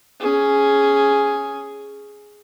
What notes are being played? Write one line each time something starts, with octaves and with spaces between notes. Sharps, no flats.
C#4 G#4